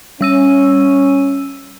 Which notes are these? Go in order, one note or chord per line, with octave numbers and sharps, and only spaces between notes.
G3 C#4 E6 D#7